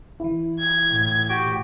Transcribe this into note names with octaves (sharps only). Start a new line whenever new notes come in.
E3 E4
G#6
A2
F#4 G4 G5